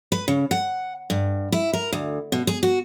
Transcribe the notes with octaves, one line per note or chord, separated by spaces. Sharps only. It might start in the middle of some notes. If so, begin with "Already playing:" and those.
B4
C#3
F#5
G2
E4
A#4
D2
B2
G#4
F#4